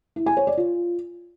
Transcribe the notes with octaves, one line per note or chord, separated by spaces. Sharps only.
E4
G#5
C#5
D5
F4